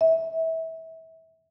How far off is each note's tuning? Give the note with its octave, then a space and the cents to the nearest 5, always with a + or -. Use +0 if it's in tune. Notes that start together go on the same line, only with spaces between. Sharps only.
E5 -25